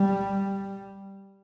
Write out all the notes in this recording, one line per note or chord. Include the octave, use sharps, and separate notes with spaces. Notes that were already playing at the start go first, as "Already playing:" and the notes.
Already playing: G3